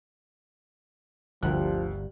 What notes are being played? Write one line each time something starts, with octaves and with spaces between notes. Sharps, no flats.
G1 D2 C3 F3 G3 A#4 F#6